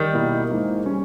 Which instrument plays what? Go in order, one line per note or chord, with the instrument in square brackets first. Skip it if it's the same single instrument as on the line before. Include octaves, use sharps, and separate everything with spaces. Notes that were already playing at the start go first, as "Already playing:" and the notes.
Already playing: [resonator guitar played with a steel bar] D#3 G3
[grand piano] B2 A#3 E4
G#2 E3 A#3 D#4
G3 C#4